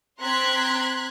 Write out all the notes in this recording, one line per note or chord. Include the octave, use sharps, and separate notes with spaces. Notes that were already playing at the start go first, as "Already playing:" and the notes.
C4 A#5 C6 F#6 G#6 B6